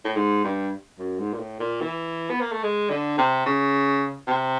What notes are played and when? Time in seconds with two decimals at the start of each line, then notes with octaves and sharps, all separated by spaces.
0.04 A2
0.16 G#2
0.44 G2
0.99 F#2
1.19 G#2
1.33 A#2
1.39 A2
1.60 A#2
1.81 E3
2.30 B3
2.41 A#3
2.52 A3
2.63 G#3
2.90 D3
3.18 C3
3.46 C#3
4.28 C3